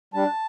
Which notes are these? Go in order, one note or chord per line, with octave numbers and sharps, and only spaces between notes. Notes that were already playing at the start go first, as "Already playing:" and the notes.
G3 D4 A5